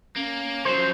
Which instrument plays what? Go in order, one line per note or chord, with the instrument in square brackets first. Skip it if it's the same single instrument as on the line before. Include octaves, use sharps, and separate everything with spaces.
[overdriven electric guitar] A#3 [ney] C#4
[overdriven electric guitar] F3 F#3 [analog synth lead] C5